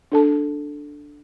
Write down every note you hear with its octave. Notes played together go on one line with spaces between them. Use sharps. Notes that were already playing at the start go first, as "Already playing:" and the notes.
D4 A4 A5